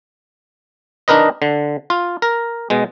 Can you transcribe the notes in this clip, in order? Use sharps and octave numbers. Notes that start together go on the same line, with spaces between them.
D4 D#4 A#4 B4 D#5
D3
F4
A#4
B2 G#3